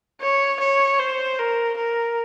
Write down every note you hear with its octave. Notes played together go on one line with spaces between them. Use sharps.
C#5
C#5
C5
A#4
A#4